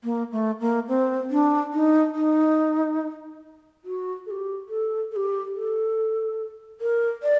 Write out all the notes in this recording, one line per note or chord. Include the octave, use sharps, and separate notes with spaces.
A#3
A3
A#3
C4
D4
D#4
D#4
F#4
A4
G4
A4
A4
G4
A4
A#4
D5